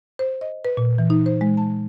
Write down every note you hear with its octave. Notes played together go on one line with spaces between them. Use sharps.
C5
D#5
B4
A#2
E3
D#4
C5
G#3
A5